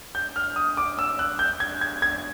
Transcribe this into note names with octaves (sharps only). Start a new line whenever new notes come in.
G6
F6
D#6
D6
E6
F#6
G6
G#6
G#6
G#6